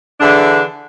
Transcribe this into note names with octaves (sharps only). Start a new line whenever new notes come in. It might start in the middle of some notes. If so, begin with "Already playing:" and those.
D3 E3 D4 G#4